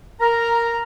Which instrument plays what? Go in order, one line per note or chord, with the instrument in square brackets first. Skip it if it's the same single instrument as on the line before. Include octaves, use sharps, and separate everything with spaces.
[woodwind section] A#4 A#5